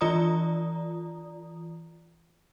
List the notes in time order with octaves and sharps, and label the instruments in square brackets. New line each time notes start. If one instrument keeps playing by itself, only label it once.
[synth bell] E3 F4 D5 A#5 D#6